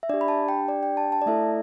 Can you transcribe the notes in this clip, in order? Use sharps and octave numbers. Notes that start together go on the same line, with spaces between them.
E5
D4 G4 D5
B5
A5
G5
D5
G5
A5
A5
D5
A3 E4 A4 E5